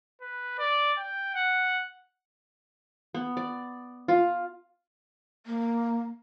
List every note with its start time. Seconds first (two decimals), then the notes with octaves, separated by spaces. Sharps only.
0.21 B4
0.58 D5
0.98 G5
1.35 F#5
3.14 B3
3.37 D5
4.08 F4
5.46 A#3